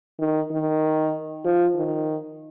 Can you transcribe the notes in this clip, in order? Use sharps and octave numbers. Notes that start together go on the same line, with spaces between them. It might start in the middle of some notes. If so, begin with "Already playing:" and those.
D#3
D#3
F3
D#3